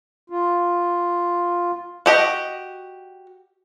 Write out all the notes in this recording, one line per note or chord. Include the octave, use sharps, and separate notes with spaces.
F4
F#4 G4 D#5